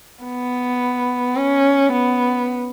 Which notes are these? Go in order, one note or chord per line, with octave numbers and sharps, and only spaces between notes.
B3
C#4
B3